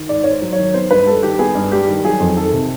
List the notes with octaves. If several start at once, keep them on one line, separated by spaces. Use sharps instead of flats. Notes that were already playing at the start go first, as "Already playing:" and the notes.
Already playing: D#3
G#2 D5
G#2 C#5
C5
F#3
C#5
D#3
B3 C5
G2 B4
G3 A4
D#3 G4
B3 G#4
G2
G3 G4
D#3
F#3 G#4
F2
D#3 A4
C3